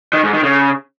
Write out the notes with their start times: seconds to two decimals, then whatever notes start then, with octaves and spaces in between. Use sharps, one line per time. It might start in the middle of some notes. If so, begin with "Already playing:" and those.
0.13 D#3
0.23 G#2
0.33 D#3
0.43 C#3